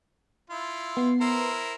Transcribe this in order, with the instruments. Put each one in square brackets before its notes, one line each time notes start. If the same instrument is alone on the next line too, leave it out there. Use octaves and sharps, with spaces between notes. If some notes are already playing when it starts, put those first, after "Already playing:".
[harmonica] E4 F4
[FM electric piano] B3 C7
[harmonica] E4 A#4 C5